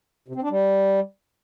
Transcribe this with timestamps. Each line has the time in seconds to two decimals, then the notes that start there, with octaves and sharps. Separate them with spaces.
0.28 C3
0.35 C4
0.43 D4
0.50 G3